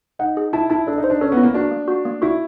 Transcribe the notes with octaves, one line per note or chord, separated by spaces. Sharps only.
D#4 F#5
G#4
E4 A5
E4 A5
D4 A4
D#4
C5
D4
C#4 A4
B3
E4
A#3
D4 F#4
A#3
F#4
A#3
E4 F#4